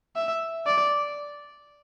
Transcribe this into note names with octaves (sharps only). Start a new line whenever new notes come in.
E5
D5